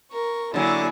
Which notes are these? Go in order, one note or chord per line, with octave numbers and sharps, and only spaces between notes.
A#4 C#6
D3 F#3 A#3 E4 G#4